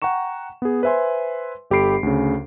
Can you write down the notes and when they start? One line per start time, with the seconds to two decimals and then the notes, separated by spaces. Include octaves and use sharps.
0.02 F#5 G5 A#5 C#6 E7
0.62 B3 G#4
0.83 B4 C5 E5 G#5 C6
1.71 G1 G4 A4 B5 C7 D7
2.03 D2 C#3